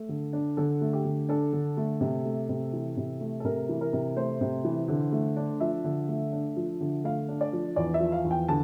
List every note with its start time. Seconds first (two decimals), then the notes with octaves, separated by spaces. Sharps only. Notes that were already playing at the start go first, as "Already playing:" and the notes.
Already playing: A3 A4
0.09 D3
0.33 D4
0.57 D3 A4
0.81 A3
0.93 G4
1.05 D3
1.29 D4 A4
1.53 D3
1.77 A3
2.01 C3
2.26 A3
2.49 C3
2.73 E3
2.97 C3
3.21 A3
3.40 A4
3.44 C3 A#4
3.69 E3
3.81 A#4
3.93 C3
4.16 A3 C5
4.41 C3
4.64 E3
4.88 D3
5.12 A3
5.37 D4
5.60 F3 E5
5.84 D3
6.08 A3
6.32 D4
6.56 F3
6.81 D3
7.04 A3 F5
7.29 D4
7.41 D5
7.53 F3
7.76 E2 D5
7.94 E5
8.00 F3
8.12 F5
8.24 E2
8.31 G5
8.48 D3 A5